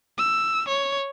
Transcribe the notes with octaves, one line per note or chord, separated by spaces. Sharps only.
E6
C#5